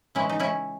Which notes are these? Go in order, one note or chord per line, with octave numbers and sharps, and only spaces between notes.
C#3 E3 G#3 C#4 E4
D#4
C#4 E4